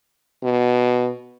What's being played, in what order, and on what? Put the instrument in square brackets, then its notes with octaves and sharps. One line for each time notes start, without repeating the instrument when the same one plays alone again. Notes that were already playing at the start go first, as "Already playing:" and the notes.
[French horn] B2